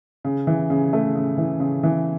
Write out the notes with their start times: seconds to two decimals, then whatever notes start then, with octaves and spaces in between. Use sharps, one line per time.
0.25 C#3
0.47 E3
0.70 C#3
0.93 A3
1.15 C#3
1.38 E3
1.60 C#3
1.83 E3